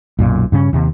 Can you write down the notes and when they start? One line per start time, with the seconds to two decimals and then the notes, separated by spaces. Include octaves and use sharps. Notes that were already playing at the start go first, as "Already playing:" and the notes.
0.19 B1 F#2 A#2
0.52 G2 C#3 C#4
0.73 D#2 C3